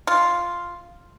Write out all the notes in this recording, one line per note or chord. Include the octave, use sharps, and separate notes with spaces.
F4